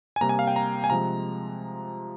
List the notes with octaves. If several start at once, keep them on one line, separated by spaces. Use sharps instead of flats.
G#5
C3 G3 A#3 A#5
G#5
F5
G5
A#5
G#5
C3 F3 G#3 A#5